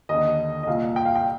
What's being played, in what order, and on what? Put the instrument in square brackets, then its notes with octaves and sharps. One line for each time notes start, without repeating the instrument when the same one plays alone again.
[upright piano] D#2 D3 D#5
D#5
C2 A#2 F5
G5
F5
G5